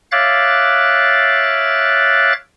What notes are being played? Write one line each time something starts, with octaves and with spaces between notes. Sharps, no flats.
C#5 E5 F5 D6 F#6 A6